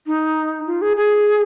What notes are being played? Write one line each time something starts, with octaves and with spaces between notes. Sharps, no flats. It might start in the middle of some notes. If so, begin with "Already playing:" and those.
D#4
F4
G#4
G#4